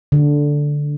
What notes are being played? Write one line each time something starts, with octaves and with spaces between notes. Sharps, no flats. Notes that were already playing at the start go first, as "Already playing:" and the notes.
D3